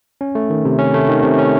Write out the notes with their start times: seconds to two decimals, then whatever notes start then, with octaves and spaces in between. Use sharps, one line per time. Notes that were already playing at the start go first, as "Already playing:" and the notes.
0.21 C#4
0.35 A3
0.50 D#3
0.65 C3
0.79 C#4
0.94 A3
1.08 D#3
1.23 C3
1.38 C#4